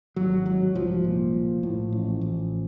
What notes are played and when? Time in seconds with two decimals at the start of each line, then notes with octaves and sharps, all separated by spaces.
0.16 G#1 F#3
0.46 G#2 F#3
0.75 C2 F3
1.04 A#2
1.34 A#1
1.63 A2
1.92 A1
2.21 A1